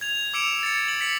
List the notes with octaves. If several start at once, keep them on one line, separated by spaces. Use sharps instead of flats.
G#6 F7
D6 E6 C#7 D7 E7 F7
A6 C#7
F#7
B6 C#7 F#7